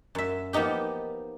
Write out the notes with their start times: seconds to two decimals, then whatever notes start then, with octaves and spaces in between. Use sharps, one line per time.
0.15 F#2 E5
0.53 F3 A#3 B3 D#4 G4